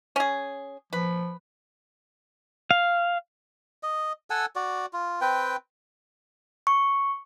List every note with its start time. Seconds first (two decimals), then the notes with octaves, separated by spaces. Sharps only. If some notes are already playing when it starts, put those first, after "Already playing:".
0.16 C#4 G#4
0.93 F3 B4
2.71 F5
3.83 D#5
4.30 A4 F#5 G#5 E6
4.56 F#4 D5
4.93 F4
5.21 C4 B4 G5
6.67 C#6